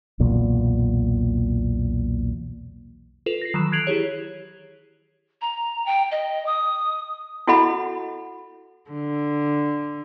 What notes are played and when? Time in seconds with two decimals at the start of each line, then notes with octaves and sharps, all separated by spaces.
0.20 B1 E2 A#2
3.26 F4 A4 B4 E7 F7
3.41 A#6 C7
3.54 D#3 E3 F#3 E7
3.72 F#6 G#6 C7 D7 F7 F#7
3.87 E4 G4 G#4 C#5
5.41 A#5
5.86 G5
6.11 D#5
6.46 D#6
7.47 E4 F#4 A4 D#5 F#5 B5
8.90 D3